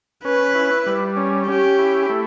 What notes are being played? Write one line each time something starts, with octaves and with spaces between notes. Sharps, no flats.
C#4 B4
E4
G3
C#4
C#4 G4
E4
A3